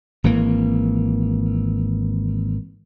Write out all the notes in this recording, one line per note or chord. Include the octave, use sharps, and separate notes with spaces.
G#1 E3 A#3